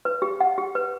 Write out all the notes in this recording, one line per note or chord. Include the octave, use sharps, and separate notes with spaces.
B4
G4
F#5
G4
B4